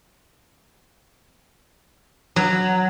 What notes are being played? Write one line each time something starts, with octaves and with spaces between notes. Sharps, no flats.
F#3